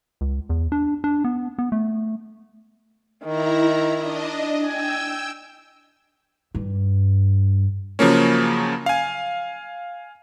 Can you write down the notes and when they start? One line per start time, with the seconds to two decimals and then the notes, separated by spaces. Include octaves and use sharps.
0.21 C#2
0.49 E2
0.72 D4
1.04 D4
1.24 B3
1.59 B3
1.72 A3
3.25 D#3 E4 A#5
3.96 D4 D#5
4.65 G5 G#5 E6
6.55 G2
7.99 C#3 F3 F#3 A#3 C#4
8.86 F5 G#5